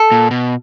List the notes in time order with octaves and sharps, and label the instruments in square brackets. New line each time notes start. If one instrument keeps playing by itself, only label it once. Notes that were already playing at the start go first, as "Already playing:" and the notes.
Already playing: [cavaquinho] A4
[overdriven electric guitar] A#2
B2